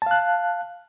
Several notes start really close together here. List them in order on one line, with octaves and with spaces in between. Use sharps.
A5 F5 F#6